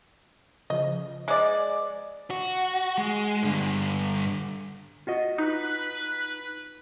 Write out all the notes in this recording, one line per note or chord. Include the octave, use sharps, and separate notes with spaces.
C#3 F3 D#5
G#3 D5
F#4
G#3
G2 D3
F4 F#4 D#5
D#4 B4